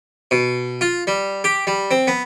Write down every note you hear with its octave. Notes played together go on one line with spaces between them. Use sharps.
B2
F4
G3
G4
G3
C4
B3